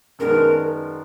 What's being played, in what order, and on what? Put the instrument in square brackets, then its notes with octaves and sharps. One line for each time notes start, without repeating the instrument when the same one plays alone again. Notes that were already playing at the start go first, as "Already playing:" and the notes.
[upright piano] F#2 D#3 G#3 B3 D4 [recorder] A#4